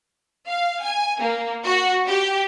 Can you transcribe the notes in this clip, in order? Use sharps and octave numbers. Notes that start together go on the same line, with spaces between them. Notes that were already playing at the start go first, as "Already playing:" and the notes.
F5
G#5
A#3
F#4
G4